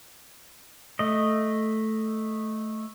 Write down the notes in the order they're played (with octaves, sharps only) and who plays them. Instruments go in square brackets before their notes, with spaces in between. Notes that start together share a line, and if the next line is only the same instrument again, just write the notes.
[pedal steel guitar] A3 D#5